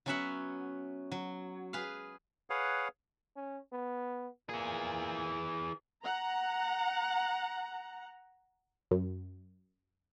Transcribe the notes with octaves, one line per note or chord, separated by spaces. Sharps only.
F#3 B3 C#4 F#4 E5 F#5
F#3
G#4 B4 F5
G#4 B4 C#5 F5 F#5
C#4
B3
A#2 E3 G#4
F#5 A#5
F#2